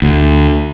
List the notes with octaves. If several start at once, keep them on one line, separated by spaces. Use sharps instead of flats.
D2